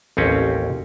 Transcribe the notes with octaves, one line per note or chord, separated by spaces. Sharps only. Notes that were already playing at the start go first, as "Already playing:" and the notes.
A1 D#2 C4 C#4